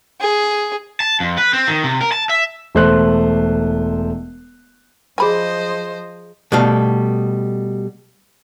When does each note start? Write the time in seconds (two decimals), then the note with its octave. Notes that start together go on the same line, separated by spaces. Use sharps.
0.20 G#4
1.00 A5
1.20 F2
1.38 B4
1.53 C4
1.68 D#3
1.84 C3
2.01 A#4
2.12 A5
2.29 E5
2.75 E1 A3 C5 C6 F#6
5.18 F3 G#4 C5 D5 D#5 G#5 B5
6.52 B2 G3 A3 F5